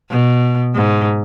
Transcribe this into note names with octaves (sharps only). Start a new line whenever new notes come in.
B2
G#2